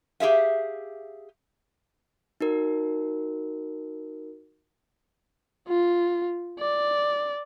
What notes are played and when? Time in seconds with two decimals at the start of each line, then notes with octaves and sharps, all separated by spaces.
0.20 G4 G#4 E5 F5
2.41 D#4 F#4 A#4
5.68 F4
6.60 D5